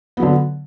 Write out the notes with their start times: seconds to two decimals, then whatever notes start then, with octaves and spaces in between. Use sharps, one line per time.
0.17 B3
0.20 F#3
0.22 D3